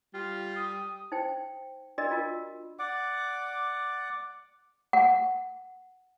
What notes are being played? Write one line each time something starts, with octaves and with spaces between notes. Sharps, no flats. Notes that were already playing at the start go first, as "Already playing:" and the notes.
G3 F4
D#6
D#4 C5 G5
D4 F#4 A#4 D5 D#5
F4 A#4
D5 F#5 D6
F#5